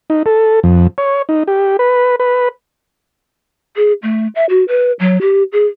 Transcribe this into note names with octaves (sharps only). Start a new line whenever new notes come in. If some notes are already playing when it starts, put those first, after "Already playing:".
D#4
A4
F2
C#5
D#4
G4
B4
B4
G#4
A3
E5
F#4
B4
F#3
G4
G#4